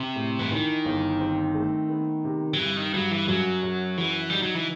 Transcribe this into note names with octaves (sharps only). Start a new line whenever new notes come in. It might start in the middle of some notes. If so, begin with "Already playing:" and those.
Already playing: C3
A2
E3
D#3 E3
G1
C4
A3
B3
C3
F#3
G2 E3
D#3
G2 F#3
E3
F#2 F#3
F#2
E3 F#4
G3 D#4
F#3
E3